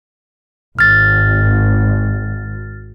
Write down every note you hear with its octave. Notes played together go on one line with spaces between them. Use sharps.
G#1 F6 A6